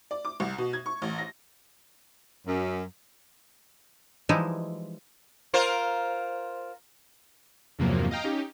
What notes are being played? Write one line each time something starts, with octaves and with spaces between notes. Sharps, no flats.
D5
D6
C2
B2
G#6
C#6
A1
A#6
F#2
E3 F3 G3 G#3 D#4 E4
F4 A#4 C5
E2 G2 C3 F3 F#3 A#3
D#5 F5 G5 A#5
C#4 D#4 G4